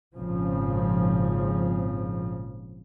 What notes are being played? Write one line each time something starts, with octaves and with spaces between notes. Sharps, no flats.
G#1 A#2 C#3 F3